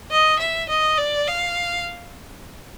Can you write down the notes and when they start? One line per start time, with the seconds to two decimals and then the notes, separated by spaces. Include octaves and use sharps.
0.11 D#5
0.39 E5
0.69 D#5
0.98 D5
1.27 F5